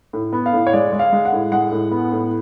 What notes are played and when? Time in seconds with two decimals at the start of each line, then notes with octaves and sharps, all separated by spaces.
0.13 A2
0.33 B3
0.46 F5
0.53 A2
0.67 C#5
0.73 G#3 D5
0.92 G#3
0.99 F5
1.12 G#3
1.25 F#5
1.32 A2
1.52 G#3 F#5
1.72 A2
1.91 B3
2.12 A2